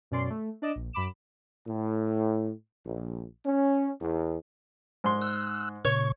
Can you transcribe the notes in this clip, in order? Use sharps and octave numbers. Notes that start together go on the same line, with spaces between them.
F#2 B2 C#4 D5 C6 C7
A3
D4 D5 D#5 E7
A#1
F#2 B5 D6 E7
A2
A#1
C#4
E2
G#2 C6
E6 F#6
A#2 C#3 C#5 C#6